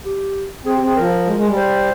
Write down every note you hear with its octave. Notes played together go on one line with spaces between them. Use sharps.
G4
C4 G#4
G4
C4 G#4
F3 A#4
G#3
G#3
G3
C5